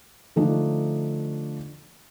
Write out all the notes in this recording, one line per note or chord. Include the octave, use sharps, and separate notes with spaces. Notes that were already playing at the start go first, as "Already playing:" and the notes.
D3 F3 A3 D4 D#4